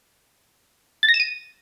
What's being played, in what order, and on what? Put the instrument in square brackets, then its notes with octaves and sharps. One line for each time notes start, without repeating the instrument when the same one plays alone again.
[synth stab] A6
A#6
E7
D#7